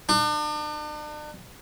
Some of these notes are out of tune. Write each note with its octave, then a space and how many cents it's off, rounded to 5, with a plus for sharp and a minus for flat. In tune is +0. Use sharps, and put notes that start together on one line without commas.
D4 +40